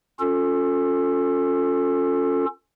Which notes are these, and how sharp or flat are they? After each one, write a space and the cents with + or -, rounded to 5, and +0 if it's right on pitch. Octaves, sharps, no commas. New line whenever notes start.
C#4 +0 F4 +30 A4 +15